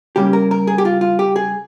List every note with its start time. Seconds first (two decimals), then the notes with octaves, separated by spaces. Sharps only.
0.16 C#3 G3 A#3 C#4 G4
0.33 A#4
0.51 A#4
0.67 G#4
0.78 G4
0.85 F4
1.01 F4
1.19 G4
1.36 G#4